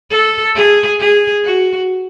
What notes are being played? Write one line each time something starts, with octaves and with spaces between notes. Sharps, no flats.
A4
G#4
G#4
F#4